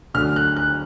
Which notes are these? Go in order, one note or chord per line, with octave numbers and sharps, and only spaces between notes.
D2 D3 F#3 F6
F#6
F#6